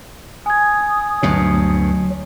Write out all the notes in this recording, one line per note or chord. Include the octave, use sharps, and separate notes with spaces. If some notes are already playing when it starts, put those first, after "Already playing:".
G#5 D#6 G#6
D2 G2 B2 F#3